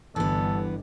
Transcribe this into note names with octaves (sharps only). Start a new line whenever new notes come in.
G1 G2 D3 E3 B3 A4